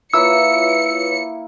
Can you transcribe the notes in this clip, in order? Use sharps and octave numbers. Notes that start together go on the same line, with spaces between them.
A#3 E4 F4 B4 C#5 E6 C#7